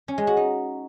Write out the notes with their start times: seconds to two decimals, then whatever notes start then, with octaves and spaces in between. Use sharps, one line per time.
0.08 C#4
0.18 G#3
0.27 F#4
0.37 D#4